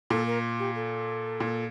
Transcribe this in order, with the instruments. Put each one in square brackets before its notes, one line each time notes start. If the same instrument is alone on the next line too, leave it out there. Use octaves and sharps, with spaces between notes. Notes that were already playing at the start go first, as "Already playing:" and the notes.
[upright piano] A#2 [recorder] A4
[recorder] A#4
G4
A4
[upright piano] A#2